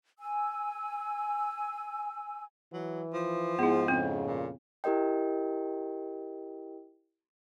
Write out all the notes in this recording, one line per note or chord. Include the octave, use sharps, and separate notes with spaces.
G#5 E6
E3 F#3
F3
G#2 B3 E4 G#4
F2 C#3 C4
A#2
E4 G4 A#4 D#5 G5